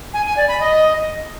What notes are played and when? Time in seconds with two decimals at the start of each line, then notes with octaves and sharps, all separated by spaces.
0.13 G#5
0.25 G#5
0.37 D5
0.48 B5
0.60 D#5